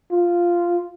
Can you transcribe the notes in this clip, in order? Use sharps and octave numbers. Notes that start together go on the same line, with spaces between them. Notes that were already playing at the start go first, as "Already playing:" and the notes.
F4